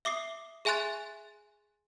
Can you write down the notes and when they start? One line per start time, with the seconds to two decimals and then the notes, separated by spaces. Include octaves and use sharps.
0.05 E5 D6 D#6 C7
0.65 G#4 E5 G#5 C6 F#6 A6